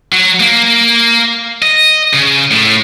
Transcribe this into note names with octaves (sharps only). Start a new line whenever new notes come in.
F#3
A#3
D#5
C#3
A2